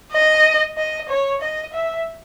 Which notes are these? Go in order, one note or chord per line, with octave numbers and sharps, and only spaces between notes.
D#5
D#5
C#5
D#5
E5